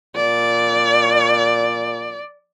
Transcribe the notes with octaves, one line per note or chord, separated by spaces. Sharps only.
A#2 D5